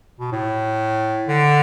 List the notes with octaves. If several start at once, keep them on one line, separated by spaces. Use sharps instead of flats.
B2
A2
D3